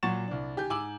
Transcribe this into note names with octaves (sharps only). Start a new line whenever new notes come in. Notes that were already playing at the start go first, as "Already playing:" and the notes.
A#2 F#3 F#5 C#6 A6 E7
C2 D4
D#3 G4 G#5 G6
G#2 G#5 D6 E6 F#7